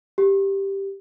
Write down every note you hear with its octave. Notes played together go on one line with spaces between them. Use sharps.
G4